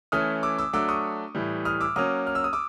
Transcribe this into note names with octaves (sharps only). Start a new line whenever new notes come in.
E3 A3 C#4 E4 D#6 F6
D6 E6
D6 E6
F#3 A3 D4 D6 E6
C#6 D#6
A2 E3 G3
D#6 F6
D6 E6
F#3 A#3 C#4 D#6 F6
F6
E6
D#6
D6 E6